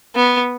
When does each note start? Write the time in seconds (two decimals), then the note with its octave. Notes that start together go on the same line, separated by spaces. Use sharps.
0.16 B3